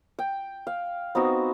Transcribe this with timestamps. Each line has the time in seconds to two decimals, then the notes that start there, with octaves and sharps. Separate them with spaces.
0.19 G5
0.67 F5
1.15 B3 C4 D#4 F#4